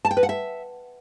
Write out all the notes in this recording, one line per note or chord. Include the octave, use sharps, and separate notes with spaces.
A5
G5
B4
F#5
E5